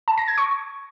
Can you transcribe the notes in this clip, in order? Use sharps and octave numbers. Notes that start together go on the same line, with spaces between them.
A5
A#6
G#6
C#6